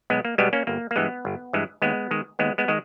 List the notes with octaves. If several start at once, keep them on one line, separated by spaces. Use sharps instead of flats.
B1 G#3 B3
A#3
B2 G3 G#3 B3
A#3 C#4
G1 A#3
A#3
G2 E3 G#3 B3
G1
G2 E3 G#3
D#2 G#3 B3
D#3 G#3
D#2 G#3 B3
G#3 B3
D#3 G#3